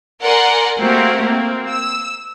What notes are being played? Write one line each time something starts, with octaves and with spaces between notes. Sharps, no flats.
A#4 D5 F#5 G#5 C6
A3 A#3 C4 F#4 G4 A#4
A#3 C4
E6